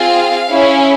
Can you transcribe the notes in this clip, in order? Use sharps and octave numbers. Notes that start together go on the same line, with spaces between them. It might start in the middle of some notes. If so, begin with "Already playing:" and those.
Already playing: C4 F4 G#4 F5
C#4 E4 G#4